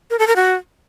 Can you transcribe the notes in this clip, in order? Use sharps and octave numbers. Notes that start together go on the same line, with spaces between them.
A#4
A4
A#4
F#4